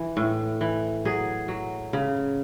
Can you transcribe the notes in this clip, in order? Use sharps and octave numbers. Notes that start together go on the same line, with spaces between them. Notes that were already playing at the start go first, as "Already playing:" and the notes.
Already playing: E3
A2
E3
F#3 G#4
F#3
C#3